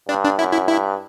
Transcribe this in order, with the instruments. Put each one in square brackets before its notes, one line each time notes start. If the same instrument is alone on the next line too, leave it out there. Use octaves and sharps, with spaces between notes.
[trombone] G2 [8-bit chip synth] D4
[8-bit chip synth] D4
[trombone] F#2 [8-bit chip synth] E4
[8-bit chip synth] E4
[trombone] G2 [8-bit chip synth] E4